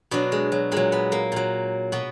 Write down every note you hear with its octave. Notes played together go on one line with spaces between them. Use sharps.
B2 F#3 D4
G#3
F#3
A#2 F#3 G#3
B3
A#3
A#2 F#3
B2 B3